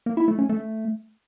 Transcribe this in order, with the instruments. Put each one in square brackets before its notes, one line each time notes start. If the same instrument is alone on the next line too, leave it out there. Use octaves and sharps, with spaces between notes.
[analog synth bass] A#3
E4
A3
C#4
A3